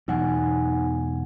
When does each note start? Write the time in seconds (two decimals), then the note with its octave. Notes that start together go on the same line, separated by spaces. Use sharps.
0.08 E2 B2 F#3 D#4 F#5 G#5